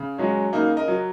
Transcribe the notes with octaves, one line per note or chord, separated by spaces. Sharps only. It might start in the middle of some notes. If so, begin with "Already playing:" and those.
Already playing: C#3
F#3 G#3 C#4
C#3 A#3 D#4
A#4 D#5
F#3